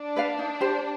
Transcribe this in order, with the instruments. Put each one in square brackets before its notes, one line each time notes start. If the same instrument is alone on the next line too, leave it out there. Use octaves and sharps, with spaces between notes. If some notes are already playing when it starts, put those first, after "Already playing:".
Already playing: [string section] D4
[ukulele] B4 D5 F5
D#4
G4 C5